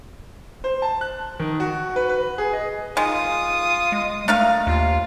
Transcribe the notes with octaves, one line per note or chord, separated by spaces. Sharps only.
C5
A5
F#6
D#3
F#4
B4
B4
G#4
D#5
D#3 G#3 F4 D#6
G#3
A3 D4 A#4 F5
D#2 F4